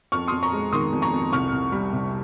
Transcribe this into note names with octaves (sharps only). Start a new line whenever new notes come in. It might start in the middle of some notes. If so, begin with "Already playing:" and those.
F2 C#6 F6
F2 C6 D#6
A#5 C#6
G#3
D#3 C6 D#6
F2
A#5 C#6
F2
C2 C#6 F6
C2
G3
C3